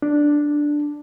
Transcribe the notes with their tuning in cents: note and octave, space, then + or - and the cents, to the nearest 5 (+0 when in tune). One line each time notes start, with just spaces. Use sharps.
D4 +0